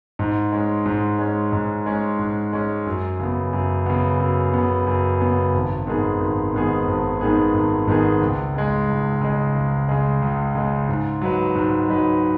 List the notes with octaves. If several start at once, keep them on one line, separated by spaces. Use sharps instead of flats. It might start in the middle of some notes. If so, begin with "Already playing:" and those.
G#2
G#3 C#4
G#2
G#3 C#4
G#2
G#3 C#4
G#2
G#3 C#4
F#2
C#3 B3
F#2
C#3 B3
F#2
C#3 B3
F#2
C#3 B3
G#1
G#2 D#3 B3 G#4
G#1
G#2 D#3 B3 G#4
G#1
G#2 D#3 B3 G#4
G#1
G#2 D#3 B3 G#4
C#2
C#3 G#3
C#2
C#3 G#3
C#2
C#3 G#3
C#2
C#3 G#3
G#2
F#3 D#4 B4
G#2
F#3 D#4 B4